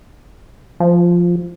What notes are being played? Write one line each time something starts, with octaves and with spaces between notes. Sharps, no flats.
F3